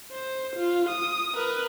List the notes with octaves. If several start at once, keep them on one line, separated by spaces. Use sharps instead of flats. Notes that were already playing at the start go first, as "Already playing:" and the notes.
C5
F4
D#6
A#4 B4